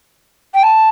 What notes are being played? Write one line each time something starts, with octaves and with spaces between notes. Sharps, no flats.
G5
A5